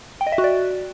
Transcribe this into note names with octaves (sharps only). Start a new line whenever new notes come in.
G5
D#5
E5
F#4
D5